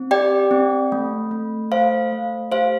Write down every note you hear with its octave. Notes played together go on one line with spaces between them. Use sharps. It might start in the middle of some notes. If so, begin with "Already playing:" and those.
Already playing: C4
G4 D5 G5
C4
A3
A3
A3 C5 F5
A3
G4 C5 F5